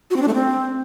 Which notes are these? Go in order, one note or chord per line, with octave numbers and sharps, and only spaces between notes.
F#4
C4
D4
A3
C4